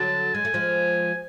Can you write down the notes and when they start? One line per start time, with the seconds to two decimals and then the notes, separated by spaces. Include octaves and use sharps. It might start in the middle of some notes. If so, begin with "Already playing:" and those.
Already playing: D3 F#3 A5
0.34 G#3 G#5
0.45 A3
0.54 F3 G#3